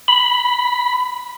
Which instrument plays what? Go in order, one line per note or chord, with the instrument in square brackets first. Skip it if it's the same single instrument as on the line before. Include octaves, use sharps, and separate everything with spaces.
[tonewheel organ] B5